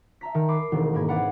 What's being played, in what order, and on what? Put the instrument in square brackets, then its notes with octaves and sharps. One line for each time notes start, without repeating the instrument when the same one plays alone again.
[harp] E5 A5 A#5 B6
D#3 F6 B6
B5 D6 C7
E1 D2 D#3 C4
G#2 A#3 B5 G#6
C4 B4 D5 F5 F#5 B5